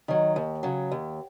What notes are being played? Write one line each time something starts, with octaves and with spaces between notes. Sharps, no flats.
D#3 F#3
D#2
C#3 F#3
D#2